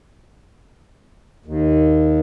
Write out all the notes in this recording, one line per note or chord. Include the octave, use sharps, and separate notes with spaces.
D#2